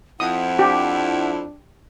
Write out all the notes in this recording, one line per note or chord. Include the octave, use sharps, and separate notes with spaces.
F2 E4 F#5 D#6
D4 G4